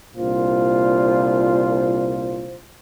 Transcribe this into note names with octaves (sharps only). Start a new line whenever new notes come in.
C2 A#2 D4 F4 C5